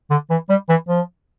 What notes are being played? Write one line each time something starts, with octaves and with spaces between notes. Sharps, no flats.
D3
E3
G3
E3
F3